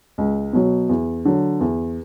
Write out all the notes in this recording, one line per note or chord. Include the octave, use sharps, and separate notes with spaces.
C#2
B2 F#3
E2
D3 F#3
E2